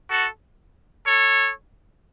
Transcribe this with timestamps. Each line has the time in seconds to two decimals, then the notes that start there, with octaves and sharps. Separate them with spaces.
0.10 F#4 A4
1.07 A4 C#5